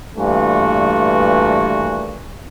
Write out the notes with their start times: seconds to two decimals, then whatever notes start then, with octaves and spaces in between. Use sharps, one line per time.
0.18 G2 A#2 E3 A3 F#4